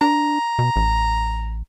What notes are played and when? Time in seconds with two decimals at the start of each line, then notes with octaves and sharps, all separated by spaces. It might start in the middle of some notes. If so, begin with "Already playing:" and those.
0.01 D4 A#5
0.59 B2
0.76 A1